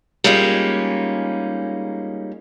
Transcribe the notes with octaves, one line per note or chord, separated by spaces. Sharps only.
G3 G#3 A#3 C#4 D#4 F4